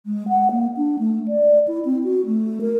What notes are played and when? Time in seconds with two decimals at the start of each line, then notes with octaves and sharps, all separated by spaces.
0.06 G#3
0.28 F#5
0.51 A#3
0.77 D4
0.99 A3
1.28 D5
1.67 E4
1.85 C4
2.04 F#4
2.26 A3
2.61 A#4